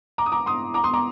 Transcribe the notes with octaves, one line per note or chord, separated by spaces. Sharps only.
A#5 D6
D#6
A#5 D6
C6 D#6
A#5 D6
C6 D#6
A#5 D6